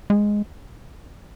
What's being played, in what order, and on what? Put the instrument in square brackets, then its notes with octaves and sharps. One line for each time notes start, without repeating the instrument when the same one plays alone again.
[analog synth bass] G#3